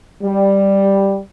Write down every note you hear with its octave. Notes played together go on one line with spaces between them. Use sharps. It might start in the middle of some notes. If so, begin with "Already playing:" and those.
G3